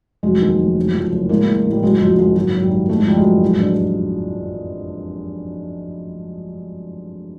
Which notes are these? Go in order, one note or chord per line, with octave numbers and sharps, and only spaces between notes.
F1 F#3 G#3
D#2
F1
F#1
F2
F#1
A1 G#3 A#3
A2
A1
G3
F#1 F#3 G#3
F2 F#3 G#3
F#1 F#3 G#3
G#1 F#3
F#2
G3
G#1
F#1 A3
G#3
F2 G3
F#3 G#3
F#1
A1
G2